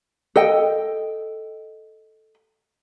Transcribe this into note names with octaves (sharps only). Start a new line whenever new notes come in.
A4 D#5 G5